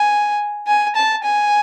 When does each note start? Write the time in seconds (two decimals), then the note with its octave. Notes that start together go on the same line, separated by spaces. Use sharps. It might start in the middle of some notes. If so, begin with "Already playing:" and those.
Already playing: G#5
0.67 G#5
0.95 A5
1.24 G#5